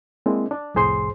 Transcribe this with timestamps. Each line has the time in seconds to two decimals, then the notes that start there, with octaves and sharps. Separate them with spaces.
0.26 G#3 A#3 C4 D4 E4
0.51 D4
0.74 C2 F2 A2 G#4 C5 C6